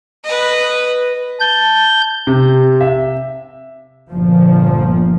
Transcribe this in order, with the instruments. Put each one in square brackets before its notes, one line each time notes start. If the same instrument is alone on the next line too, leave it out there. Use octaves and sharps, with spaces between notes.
[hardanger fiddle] B4 D#5
[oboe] A5 [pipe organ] G6
[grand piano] C3
E5
[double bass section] G1 A#2 F3